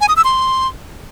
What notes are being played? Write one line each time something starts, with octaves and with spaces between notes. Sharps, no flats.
G#5
D#6
E6
C6